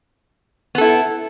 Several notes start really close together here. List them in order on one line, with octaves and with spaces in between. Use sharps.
B3 A4 E4